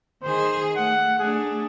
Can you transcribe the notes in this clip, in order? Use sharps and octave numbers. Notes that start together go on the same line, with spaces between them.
D#3 G#4 C5
A3 F#5
A3 D4 G#4